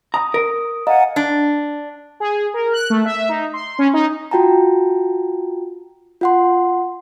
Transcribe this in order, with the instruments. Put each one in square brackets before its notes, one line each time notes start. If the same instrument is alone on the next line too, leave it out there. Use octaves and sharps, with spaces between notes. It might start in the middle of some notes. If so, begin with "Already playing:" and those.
[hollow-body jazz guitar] A#5 [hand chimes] D#6
[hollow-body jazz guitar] A#4
[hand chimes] D#5 F5 A#5 [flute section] F#5 G#5
[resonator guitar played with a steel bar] D4
[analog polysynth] G#4
A#4
F#6
A3
E5
D#4
C6
C#4
D#4
[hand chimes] F4 F#4 G5 A5 A#5
F4 F#5 C6